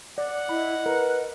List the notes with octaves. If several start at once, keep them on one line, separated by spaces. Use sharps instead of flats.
D5 F#5
E4 D#5 B5
A#4 B4